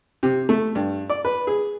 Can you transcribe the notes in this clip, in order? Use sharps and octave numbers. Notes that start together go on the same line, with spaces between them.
C3
A3
G2
D5
B4
G#4